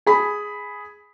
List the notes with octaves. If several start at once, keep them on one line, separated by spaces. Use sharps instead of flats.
G#4 B5